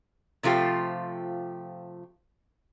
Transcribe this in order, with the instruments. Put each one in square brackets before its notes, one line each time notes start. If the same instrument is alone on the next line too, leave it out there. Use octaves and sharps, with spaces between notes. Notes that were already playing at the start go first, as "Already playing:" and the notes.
[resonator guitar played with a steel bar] C3 F3 A3 F4 G4